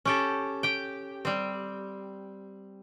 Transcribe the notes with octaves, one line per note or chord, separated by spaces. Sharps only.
C#4 G4 A4
G4 G5
G3 C4